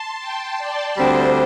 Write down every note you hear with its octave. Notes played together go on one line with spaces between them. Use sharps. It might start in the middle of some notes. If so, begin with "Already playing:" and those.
Already playing: A5 C6
G5
D5
D2 D3 G3 C4 C5